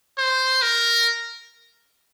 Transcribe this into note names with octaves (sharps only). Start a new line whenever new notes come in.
C5
A#4